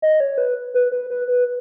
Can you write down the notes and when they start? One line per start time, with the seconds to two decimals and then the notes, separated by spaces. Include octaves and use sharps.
0.02 D#5
0.20 C#5
0.38 B4
0.74 B4
0.92 B4
1.10 B4
1.28 B4